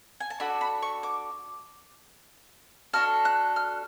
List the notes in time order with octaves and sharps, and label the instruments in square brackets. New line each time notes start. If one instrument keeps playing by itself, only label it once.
[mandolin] G#5
A5
D4 F#4 A4 B5
B5
C#6
D6
D4 F#4 A4 F6
F#6
F6